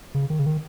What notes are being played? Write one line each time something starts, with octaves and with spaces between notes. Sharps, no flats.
C#3
D#3
C#3
D#3